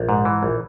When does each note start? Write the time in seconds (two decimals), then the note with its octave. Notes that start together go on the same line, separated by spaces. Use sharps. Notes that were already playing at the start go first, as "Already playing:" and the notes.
Already playing: A#1
0.09 G#2
0.25 E3
0.43 A#1